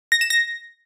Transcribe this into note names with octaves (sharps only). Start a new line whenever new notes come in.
A#6
E7
A#6